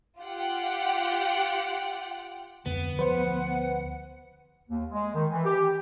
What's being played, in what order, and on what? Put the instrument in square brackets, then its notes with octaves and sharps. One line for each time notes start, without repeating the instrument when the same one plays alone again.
[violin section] F4 G4 F#5 G5
[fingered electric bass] D1 F2 D3 [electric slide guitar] B3
[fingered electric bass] D2 F3 [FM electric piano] B4 C5 [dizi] F#5
[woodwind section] D#2
G#3
D#3
E3
G4